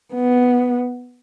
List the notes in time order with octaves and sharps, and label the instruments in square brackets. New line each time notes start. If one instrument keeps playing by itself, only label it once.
[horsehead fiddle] B3